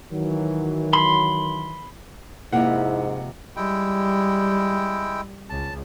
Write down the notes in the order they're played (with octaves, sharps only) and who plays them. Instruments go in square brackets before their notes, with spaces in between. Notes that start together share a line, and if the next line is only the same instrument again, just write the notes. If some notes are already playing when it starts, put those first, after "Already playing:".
[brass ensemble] D#3 E3 F#3
[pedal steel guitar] B5 C6
[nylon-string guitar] F2 C3 A#3 [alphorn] G#2 [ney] E4 [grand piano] F#5
[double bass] G3 [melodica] G#3 E4 G5
[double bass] C#2 [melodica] A5